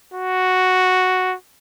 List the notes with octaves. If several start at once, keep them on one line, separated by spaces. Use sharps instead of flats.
F#4